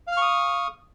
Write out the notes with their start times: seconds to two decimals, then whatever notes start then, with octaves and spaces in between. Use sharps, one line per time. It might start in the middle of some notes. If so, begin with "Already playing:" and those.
0.07 F5
0.12 F6
0.17 C#6
0.22 D#6